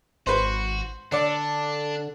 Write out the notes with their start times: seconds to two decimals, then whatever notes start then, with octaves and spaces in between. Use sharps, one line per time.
0.27 G#1 F#4 B4 C5
1.12 D3 D4 A4 D5